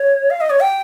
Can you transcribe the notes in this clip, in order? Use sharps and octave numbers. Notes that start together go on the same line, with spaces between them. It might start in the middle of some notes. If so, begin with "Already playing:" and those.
Already playing: C#5
F5
D#5
C#5
G5